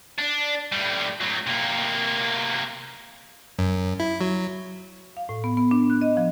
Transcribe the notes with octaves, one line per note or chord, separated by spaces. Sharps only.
D4
A2 G3
A2 F#3
C3 A#3
F#2
E4
F#3
F5
A2
B3
B3
D4
F#6
D#5
F3